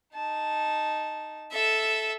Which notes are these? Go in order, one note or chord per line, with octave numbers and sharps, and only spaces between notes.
D#4 A5
A4 E5